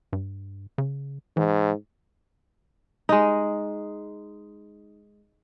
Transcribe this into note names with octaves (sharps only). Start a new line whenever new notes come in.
G2
C#3
G#2 E3
G#3 D#4